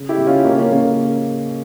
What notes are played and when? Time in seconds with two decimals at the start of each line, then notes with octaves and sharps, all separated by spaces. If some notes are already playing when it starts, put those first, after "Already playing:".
Already playing: C#3
0.09 E4 G4
0.18 C#3
0.27 C#4 F4
0.45 C#3 A#3 C#4
0.58 A#3 C#4
0.71 C#3 A#3